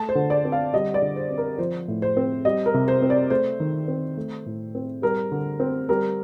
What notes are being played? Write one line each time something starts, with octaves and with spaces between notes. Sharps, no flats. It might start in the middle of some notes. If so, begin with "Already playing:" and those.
Already playing: A3 A5
C5
D3
D5
C4
F5
G3 D#5
D5
D3
C5
C4
A#4
F3 C5
A2
C5
C4
G3 D#5
A#4
C3
C5
C4
D5
A3 C5
D#3
C4
A3
A2
C4
G3 A#4
D3
C4
G3 A#4